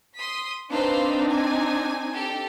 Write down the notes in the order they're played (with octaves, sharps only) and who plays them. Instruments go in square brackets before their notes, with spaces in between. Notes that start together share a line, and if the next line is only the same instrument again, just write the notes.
[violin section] C6 D#6 B6
[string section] C4 D4 D#4 [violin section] B4 C5 F5
[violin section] G#5
G4 A4